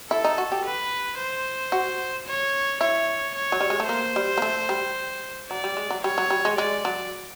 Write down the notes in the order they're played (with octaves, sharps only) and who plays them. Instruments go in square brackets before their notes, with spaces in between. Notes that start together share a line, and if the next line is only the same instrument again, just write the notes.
[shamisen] E4 [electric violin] A4
[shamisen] D#4
F#4
G4
[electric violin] B4
C5
[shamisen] F#4
[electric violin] C#5
[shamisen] E4 [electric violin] C#5
[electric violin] C#5
[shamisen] F#3
G3
G#3
A3
[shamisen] A#3 [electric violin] C5
[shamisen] G3
A#3
A3
G3
[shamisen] F#3 [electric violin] D5
[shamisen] G3
G#3
F#3
[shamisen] G3 [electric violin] C#5
[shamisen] F#3
G3
G#3
[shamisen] G#3 [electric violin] D5
[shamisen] F#3